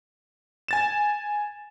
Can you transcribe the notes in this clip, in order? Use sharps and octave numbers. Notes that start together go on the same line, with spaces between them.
G#5 A6 E7